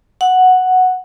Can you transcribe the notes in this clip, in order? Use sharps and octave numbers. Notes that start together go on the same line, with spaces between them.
F#5